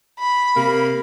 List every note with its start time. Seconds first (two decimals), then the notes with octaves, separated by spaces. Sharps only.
0.19 B5
0.56 C3 A#3